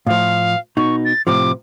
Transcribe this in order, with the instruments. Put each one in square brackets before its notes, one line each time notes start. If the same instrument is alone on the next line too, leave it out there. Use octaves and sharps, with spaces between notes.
[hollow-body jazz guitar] A2 F3 [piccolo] F5
[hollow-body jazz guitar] B2 D#4 [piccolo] C#6
[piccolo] A6
[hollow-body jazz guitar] A2 C3 F3 [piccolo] D6